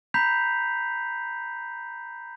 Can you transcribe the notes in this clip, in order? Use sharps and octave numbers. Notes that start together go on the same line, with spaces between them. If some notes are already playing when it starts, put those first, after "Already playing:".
A#5 B5 G6 B6 C7 F7